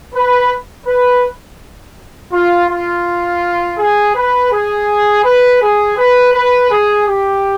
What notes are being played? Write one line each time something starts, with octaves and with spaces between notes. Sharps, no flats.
B4
B4
F4
F4
G#4
B4
G#4
B4
G#4
B4
B4
G#4
G4